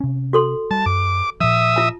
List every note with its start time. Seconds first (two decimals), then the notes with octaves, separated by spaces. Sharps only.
0.01 C3 C#4
0.33 F#4 A4 C6
0.71 G3 A5
0.86 F#2 D6
1.41 A#2 F3 E5 D#6
1.76 F4 A5